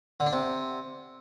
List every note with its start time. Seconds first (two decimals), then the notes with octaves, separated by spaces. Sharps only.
0.20 D3
0.26 D4
0.32 C3